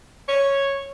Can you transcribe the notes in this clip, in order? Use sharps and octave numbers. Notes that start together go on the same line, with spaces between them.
C#5